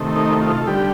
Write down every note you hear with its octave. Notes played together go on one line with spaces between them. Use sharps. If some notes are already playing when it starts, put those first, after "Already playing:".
Already playing: C3 D#3 A3
D#4
F4
A4
D3 G3 G4